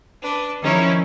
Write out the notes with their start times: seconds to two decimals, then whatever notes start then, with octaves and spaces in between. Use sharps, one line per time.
0.23 D4 B4
0.62 D#3 F3 C#4 D#4 E4